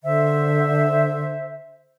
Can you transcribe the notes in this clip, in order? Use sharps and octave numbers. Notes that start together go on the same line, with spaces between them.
D3 C5 E5